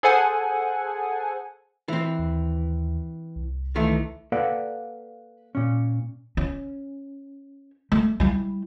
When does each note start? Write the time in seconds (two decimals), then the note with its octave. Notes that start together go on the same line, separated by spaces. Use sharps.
0.03 G#4 A4 C5 F#5 G#5
1.88 E3 C4
2.19 D#2
3.36 C2
3.76 D#3 E3 A3
4.32 A#3 A4 B4 D5 F5 F#5
5.55 A#2 C#4
6.37 C#4
7.92 A3
8.20 G3 E4